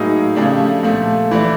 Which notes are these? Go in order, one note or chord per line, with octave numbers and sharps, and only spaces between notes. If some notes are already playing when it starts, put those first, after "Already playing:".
Already playing: A2 F#3 A#3 D#4 G#4
C#3 F3 A3 D4 G4
A#2 F3 A3
E3 A3 D4